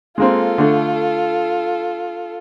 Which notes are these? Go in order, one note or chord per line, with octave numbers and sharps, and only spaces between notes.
G#3 A#3 C4 F4 A4
D3 A3